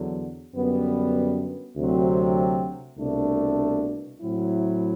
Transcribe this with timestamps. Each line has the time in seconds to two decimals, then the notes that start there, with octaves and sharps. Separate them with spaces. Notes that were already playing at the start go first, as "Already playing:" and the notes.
Already playing: E2 D3 F#3
0.54 F#2 D3 G3 B3
1.76 D2 C3 F#3 C4
2.98 C2 B2 A3 D4
4.20 A2 F#3 C4 E4